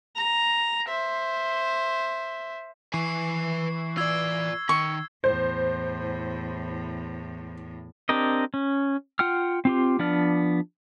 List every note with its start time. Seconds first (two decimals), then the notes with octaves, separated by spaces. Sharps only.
0.16 A#5
0.89 C5 E5
2.94 E3 B4 G#5 C#6 C7
3.97 F4 D5 E6 G#6
4.69 D#3 C#6
5.24 E2 A2 C5
8.09 C4 D4 G4 A#4 D#5
8.54 C#4
9.19 F4 F#5 G5 F6
9.65 C4 F4 G4
9.99 F3 B3 D4 D5 F6